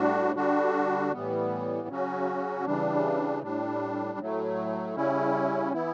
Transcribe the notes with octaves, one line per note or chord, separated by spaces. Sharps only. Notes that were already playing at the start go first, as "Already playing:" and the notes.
Already playing: A2 G3 D4 F#4
D3 G3 D4 F#4
A2 E3 G3 B3
C#3 F#3 C#4 F#4
C#3 E3 G3 D4
A2 G3 D4
A2 F#3 A3
C#3 G3 C#4 E4
E3 B3 E4